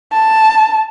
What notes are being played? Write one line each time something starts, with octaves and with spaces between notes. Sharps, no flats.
A5